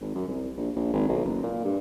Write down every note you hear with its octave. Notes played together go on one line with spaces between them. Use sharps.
G#1
F#2
C2
A#1
A#1
G#1
B1
F#1
A#2
G2